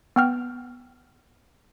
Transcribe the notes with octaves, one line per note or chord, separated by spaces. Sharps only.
B3 G5 F6